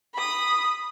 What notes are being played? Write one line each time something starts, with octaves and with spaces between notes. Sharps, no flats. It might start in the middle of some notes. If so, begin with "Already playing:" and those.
B5 D#6